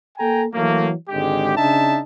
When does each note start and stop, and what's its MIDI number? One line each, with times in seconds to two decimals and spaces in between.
0.18 0.44 58
0.18 0.44 69
0.18 0.44 79
0.18 0.44 80
0.18 0.44 82
0.54 0.90 52
0.54 0.90 54
0.54 0.90 57
0.54 0.90 58
1.09 1.56 32
1.09 1.56 50
1.09 1.56 56
1.09 1.56 67
1.56 2.00 49
1.56 2.00 62
1.56 2.00 63
1.56 2.00 76
1.56 2.00 81